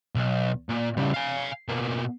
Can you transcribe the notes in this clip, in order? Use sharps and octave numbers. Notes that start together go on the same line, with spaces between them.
B1
A#2
C#3 G3
F5 G#5
B2 A#3